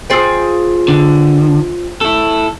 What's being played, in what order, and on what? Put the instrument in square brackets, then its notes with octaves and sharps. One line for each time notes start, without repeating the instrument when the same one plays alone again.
[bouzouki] F4 G#4 G5 [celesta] C5 E6
[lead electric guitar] D3
E4 A4